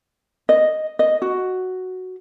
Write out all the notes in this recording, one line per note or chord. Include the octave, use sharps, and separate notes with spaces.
D#5
D#5
F#4